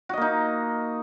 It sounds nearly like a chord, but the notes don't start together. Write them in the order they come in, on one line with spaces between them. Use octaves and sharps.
F#4 D#5 A#3 D#4